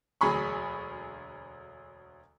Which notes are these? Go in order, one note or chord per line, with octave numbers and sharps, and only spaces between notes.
E1 D2 F#3 G#4 B5 C#6